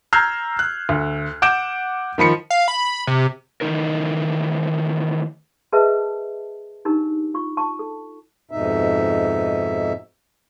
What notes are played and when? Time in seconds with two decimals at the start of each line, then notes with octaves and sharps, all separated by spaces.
0.13 A#5 E6 F6 G6 G#6 C7
0.59 F#6
0.89 D2
1.42 F#5 D6 G6 D7 E7
2.18 D#3 F3 B5 C#7
2.50 F5
2.68 B5
3.07 C3
3.61 D#3 E3 G#3 A3 D#4 A#4
5.72 G#4 A#4 B4 D#5 E5 A5
6.85 D4 D#4 G4 A#4 A#5
7.34 F4 C#6
7.57 A5 C#6
7.79 A4
8.51 F2 G#2 B2 D#4 E5